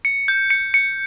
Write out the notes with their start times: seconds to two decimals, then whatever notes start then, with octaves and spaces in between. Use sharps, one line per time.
0.05 C#7
0.28 G6
0.50 C#7
0.74 C#7